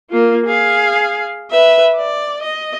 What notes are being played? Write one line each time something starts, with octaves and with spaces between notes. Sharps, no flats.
A#3 F4
G#4 F5
B4 E5
D5
D#5